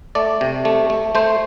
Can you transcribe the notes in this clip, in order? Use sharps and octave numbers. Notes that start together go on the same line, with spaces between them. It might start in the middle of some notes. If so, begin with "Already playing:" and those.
A3 D5
C3
A3
A3
A3 C5